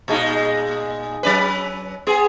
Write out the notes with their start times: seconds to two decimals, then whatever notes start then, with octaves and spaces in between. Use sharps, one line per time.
0.08 A#2 G#3 D#4
1.23 F#3 C#4 B4
2.07 B3 G#4